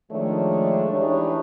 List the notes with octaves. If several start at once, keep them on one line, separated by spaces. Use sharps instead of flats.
D#3 F3 G#3 A3 D4 C#5
E3 D4 D#4 G4 C#5